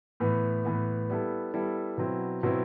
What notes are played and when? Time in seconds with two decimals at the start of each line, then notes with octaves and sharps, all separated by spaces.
0.20 A2 E3 B3
0.65 A2 E3 B3
1.10 G3 B3 E4 A4
1.54 G3 B3 E4 A4
1.98 B2 F#3 C4 E4
2.43 B2 F#3 C4 E4